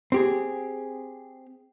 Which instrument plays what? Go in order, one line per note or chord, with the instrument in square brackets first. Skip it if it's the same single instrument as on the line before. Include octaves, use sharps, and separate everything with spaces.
[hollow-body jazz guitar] C4 G4 G#4